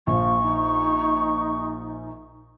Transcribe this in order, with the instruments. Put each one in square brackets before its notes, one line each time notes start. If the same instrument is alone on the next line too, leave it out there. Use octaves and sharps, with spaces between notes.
[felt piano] A#1 [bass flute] F3 [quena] C#6
[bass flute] D#4